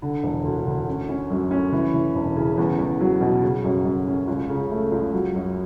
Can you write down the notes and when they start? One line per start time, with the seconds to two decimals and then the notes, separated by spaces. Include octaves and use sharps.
0.02 D3
0.23 E1
0.44 D2
0.67 D2
0.87 C#4
1.09 C#4
1.30 F#2
1.51 C#4
1.72 E3
1.94 E3
2.15 E1
2.36 C#3
2.58 E2
2.79 E2
3.01 F#3
3.21 B2
3.43 C#3
3.64 F#2
3.85 F#2
4.07 C#4
4.27 C#2
4.49 C#3
4.71 A3
4.92 C#2
5.13 F#3
5.35 F#2